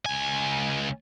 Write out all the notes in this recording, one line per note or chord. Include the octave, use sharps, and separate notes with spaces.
C#2 G#5